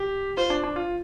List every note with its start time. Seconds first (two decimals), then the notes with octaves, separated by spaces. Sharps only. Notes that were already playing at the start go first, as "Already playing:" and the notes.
Already playing: G4
0.37 F4 C5
0.50 D4
0.64 D4
0.76 F4